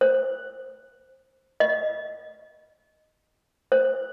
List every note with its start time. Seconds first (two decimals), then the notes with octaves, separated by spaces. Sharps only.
0.01 C5
1.60 D#5
3.72 C5